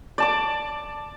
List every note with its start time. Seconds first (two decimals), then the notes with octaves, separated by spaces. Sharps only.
0.18 D5 A5 D6